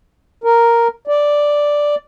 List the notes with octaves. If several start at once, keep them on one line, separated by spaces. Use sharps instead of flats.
A#4
D5